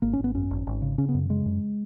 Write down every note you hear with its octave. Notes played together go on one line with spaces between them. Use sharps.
G#1 A#3
C#4
G#1 B3
F#2 C#4
G#1
G#1
C#3
C#3 C#4
B3
F#2
C#3 G#3
F#2